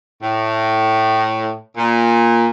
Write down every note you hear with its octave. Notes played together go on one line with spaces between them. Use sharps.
A2
A#2